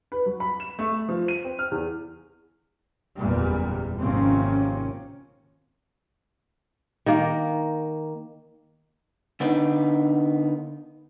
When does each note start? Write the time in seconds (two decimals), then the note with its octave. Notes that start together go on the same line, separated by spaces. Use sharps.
0.12 B4
0.26 F#3
0.40 B5
0.60 E7
0.79 A3
0.92 A3
1.09 F3
1.28 D#7
1.45 C4
1.59 F6
1.72 E2
3.16 F#1 E2 A#2 G3
3.99 G#1 C3 F3 A#3 C4 C#4
7.06 D#3 A#3
9.40 D3 B3 D4 D#4